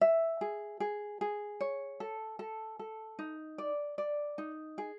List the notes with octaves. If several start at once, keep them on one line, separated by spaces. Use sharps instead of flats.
E5
G#4
G#4
G#4
C#5
A4
A4
A4
D#4
D5
D5
D#4
G#4